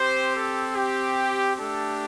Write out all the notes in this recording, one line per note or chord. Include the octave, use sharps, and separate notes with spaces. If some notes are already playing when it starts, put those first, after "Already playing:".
Already playing: C4 G4 C5
A4
G4
A3 D4 G4 A4